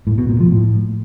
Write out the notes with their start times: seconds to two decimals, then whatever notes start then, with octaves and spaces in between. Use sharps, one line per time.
0.07 A2
0.18 B2
0.29 A#2
0.40 F3
0.51 A2